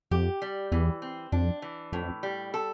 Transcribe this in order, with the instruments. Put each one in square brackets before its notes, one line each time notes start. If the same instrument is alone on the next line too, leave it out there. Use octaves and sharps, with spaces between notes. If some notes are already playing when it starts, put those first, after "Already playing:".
[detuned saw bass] F2 [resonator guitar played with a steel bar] G4
[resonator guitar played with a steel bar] G3
[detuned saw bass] E2 [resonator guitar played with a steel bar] E3
[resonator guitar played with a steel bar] C4
[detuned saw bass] F2 [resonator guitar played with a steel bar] D4
[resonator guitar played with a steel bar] E3
[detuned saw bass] F2 [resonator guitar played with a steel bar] A2
[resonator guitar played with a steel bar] G3
A4